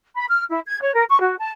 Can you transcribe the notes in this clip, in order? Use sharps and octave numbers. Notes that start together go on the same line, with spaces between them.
B5
F6
E4
G#6
C#5
A#4
C#6
F#4
A5